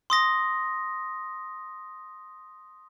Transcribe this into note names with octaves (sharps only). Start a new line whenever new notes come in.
C6 D#6 A#6